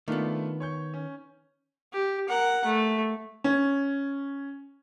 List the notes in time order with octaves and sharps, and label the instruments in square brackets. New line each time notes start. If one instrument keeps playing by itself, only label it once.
[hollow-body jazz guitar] D#3 B3 [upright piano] A3 D4 F4
[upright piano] C#5 C#6 G6
C#4
[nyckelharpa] G4
A#4 F#5
A3
[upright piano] C#4